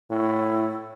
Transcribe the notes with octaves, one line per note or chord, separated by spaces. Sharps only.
A2 E4